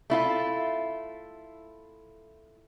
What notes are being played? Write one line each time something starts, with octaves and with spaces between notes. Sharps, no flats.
A3 E4 F4